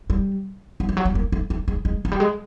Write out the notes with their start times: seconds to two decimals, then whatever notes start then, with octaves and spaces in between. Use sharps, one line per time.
0.10 G3
0.80 F#3
0.89 F3
0.97 F#3
1.05 G3
1.15 A#3
1.32 A3
1.50 A3
1.68 G#3
1.85 G#3
2.05 F#3
2.12 G3
2.20 G#3